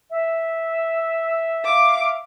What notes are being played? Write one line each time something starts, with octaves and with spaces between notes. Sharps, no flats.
E5
F5 D6